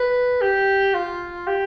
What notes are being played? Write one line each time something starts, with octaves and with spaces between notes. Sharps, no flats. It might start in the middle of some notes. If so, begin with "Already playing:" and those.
Already playing: B4
G4
F4
G4